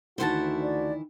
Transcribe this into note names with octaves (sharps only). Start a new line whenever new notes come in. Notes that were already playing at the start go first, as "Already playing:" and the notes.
D2 D#3 E3 E4 F#4 C5 F#5 A5
D5